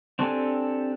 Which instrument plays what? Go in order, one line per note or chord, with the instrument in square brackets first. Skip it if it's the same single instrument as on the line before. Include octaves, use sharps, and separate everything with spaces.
[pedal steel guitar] C4 D4 G4 A4 G#5